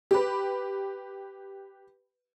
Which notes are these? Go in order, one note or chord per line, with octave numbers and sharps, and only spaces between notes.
G4 B4